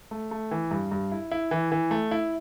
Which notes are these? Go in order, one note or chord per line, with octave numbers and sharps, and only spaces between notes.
A3
A3
E3
G2
G2
E4
E4
E3
E3
A3
E4